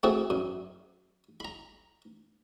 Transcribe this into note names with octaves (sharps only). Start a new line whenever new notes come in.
A3 C4 E4 F#4 G#4 A4
F#2
A#5 B5